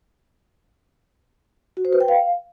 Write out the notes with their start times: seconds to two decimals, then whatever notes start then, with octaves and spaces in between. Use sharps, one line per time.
1.77 F#4
1.85 C5
1.93 B4
2.00 G5
2.08 F5